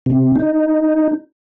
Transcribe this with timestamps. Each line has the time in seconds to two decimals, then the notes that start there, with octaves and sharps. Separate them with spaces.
0.06 C3
0.36 D#4